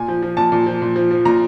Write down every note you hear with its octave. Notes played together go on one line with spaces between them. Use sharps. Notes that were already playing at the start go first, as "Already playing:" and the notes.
Already playing: A#2 G#5
F3
F3
A#2 A5
A#2
F3
A#2
F3
F3
A#2 A#5